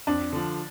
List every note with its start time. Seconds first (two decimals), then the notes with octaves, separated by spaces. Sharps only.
0.07 F2 D4
0.33 D3 F3